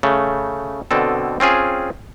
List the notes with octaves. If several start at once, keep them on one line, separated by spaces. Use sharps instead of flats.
C#3 A3
B2 D3 C4 A4
C4 C#4 F4 G#4